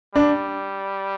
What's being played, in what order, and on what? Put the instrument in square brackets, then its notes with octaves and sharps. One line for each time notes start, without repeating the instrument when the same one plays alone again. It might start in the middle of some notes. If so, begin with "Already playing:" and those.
[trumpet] G3 [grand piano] D4